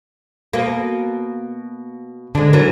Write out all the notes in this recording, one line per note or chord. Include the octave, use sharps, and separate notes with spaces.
B2 A#3
D3 G#3 D4
E3 F#3 A#4